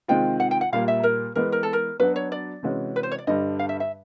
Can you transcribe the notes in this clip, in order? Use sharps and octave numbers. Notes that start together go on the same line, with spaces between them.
C3 D#3 G#3 C4 F4 G5
F#5
G5
F#5
A#2 G3 A#3 F5
E5
A#4
E3 G#3 B3 A#4
A#4
A4
A#4
F#3 B3 D4 F#4 B4
C#5
D5
C3 E3 G#3 C#4 F#4
B4
C5
C#5
D5
G2 D3 G3 D#5
F5
E5
E5